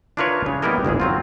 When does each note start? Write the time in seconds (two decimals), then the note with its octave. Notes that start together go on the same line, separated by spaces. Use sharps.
0.17 D4 E4 F4 A#4 B4 C#5
0.46 C#3
0.62 G3 A#3 B3 E4 A#4 D#5
0.85 G1 C2 G#2 G#4
1.00 F#3 C4 F4